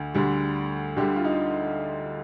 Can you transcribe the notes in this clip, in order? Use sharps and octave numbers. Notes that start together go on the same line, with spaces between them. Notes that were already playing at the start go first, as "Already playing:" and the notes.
Already playing: D2 D3
D2 D3 G3
D2 D3 G3 G4
F4
D#4